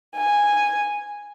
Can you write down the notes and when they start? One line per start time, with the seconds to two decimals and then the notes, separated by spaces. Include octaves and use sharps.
0.17 G#5